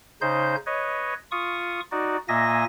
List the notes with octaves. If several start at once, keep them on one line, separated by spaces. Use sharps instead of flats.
C#3 D#4 C5 G6
B4 C#5 D#5
F4 C#6 D#6
D#4 F#4 D5
A#2 A#3 D#5 E5 G#5 A#6